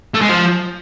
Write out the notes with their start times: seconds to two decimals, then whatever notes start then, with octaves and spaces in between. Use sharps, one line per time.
0.14 A3
0.21 G#3
0.29 F3